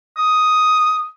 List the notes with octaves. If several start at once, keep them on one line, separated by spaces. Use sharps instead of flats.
D#6